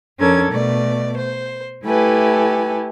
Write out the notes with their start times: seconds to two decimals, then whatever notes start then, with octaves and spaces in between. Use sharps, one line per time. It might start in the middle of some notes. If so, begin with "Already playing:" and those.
0.19 F2 C#4 D4 A4 A#4 G#6
0.51 B2 A3 D5
1.17 C5
1.84 A3 E4 G4 A4 B4 G#5